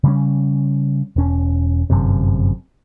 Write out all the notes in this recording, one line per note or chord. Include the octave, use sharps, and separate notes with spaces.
C#3 G3 C#4
E1 C#4
G1 F#2 C3